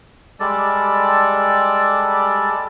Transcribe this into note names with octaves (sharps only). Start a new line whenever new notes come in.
G3 G#3 A4 D5